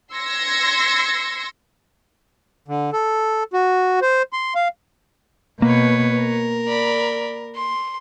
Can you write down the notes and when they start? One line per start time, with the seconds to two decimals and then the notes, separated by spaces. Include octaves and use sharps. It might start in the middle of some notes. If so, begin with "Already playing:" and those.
0.13 C6 E6 G#6 A#6 C#7
2.68 D3
2.93 A4
3.53 F#4
4.02 C5
4.33 C6
4.55 F5
5.62 B2 A#3 B4 C#5
6.18 A#4
6.68 D5 B5
7.55 C6